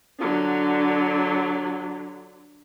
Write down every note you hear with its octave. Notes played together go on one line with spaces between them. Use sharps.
D3 F#3